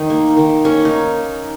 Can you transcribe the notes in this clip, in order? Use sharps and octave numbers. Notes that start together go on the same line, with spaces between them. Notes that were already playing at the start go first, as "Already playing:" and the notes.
Already playing: D#3 D#4
A#3
D#3
A#3 C#4
D#4